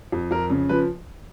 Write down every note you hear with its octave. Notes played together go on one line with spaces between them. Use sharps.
F2
F2 A#4
C#3
F3 B4